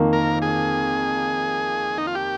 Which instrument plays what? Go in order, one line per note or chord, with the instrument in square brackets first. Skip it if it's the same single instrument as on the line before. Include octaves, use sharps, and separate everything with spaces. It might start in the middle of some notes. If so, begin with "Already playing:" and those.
Already playing: [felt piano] F2 D#3 A#3
[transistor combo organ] A#4
G#4
D#4
F4
G4